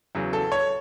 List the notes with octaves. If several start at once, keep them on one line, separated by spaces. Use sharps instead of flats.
E2 C#3 F#3
A4
C#5